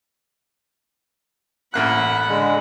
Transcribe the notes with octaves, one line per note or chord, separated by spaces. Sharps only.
A1 A#3 F#5 B5 F#6
D3 G#3